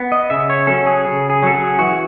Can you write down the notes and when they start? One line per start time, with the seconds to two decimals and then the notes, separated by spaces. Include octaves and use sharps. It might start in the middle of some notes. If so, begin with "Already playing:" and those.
Already playing: B3
0.12 D#5
0.30 C#3 E5
0.50 C#5
0.67 F#3 C#4 A4
0.86 G#4
1.05 C#3 G#4
1.30 G#4
1.42 F#3 C#4 A4
1.55 G#4
1.79 E3 F#4